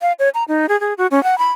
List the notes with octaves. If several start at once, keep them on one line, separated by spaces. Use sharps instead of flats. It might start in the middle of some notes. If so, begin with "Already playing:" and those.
F5
C#5
A#5
D#4
G#4
G#4
F#4
C#4
F#5
B5